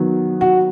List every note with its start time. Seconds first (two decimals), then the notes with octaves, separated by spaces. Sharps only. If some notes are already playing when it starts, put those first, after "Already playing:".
Already playing: D#3 F#3 B3
0.41 F#4